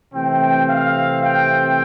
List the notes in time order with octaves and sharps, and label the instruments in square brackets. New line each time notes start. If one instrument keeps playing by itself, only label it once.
[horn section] C3 E3 A3 C4 G5
F5
G5